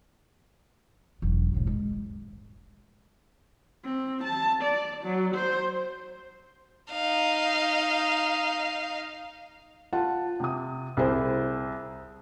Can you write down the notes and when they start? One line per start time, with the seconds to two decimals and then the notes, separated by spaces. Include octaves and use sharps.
1.22 E1 F#3
1.54 B1 G#2
1.67 G#3
3.85 C4
4.24 A5
4.62 D5
5.04 F#3
5.35 C5
6.91 D#4 F5
9.93 F4 F#5 A5
10.40 C3 D#6
10.97 C2 E4 G#4 C5